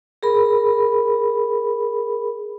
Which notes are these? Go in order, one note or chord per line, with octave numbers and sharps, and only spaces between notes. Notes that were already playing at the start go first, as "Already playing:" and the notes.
G#4 A#4 B5